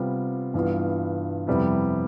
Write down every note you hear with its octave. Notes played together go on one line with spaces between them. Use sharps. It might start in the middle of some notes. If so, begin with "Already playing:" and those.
Already playing: C3 G3 B3 F4
G2 E3 B3 F4
F2 C3 G3 B3 E4